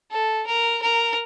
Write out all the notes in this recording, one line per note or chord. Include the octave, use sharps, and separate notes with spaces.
A4
A#4
A#4